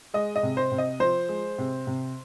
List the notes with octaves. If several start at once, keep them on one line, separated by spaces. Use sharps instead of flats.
G#3 D#5
D#5
C3
C5
C3
D#5
F3 C5
G#3
C3
C3